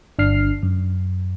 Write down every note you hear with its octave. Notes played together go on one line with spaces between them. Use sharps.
G1 D4 F6 C7
F#2